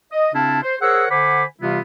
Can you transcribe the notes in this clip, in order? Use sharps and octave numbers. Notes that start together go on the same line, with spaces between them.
D#5
C#3 C4 D4 E4 F4 A5
C5
G#4 A#4 C5 C#5 F#5 E6
D3 C5 F#5 G#5 B5 D6
C3 E3 G3 B3 E4 F4